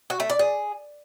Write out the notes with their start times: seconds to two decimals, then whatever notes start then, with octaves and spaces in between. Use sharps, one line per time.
0.10 F#4
0.20 A3
0.30 D5
0.39 G#4